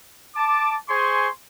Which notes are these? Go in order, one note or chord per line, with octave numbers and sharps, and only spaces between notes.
A5 D6
G#4 C5 G#5 C6 C#6